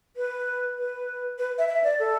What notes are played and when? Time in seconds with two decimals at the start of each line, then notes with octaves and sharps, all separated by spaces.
0.16 B4
0.78 B4
1.38 B4
1.58 E5
1.68 E5
1.84 D5
1.99 A4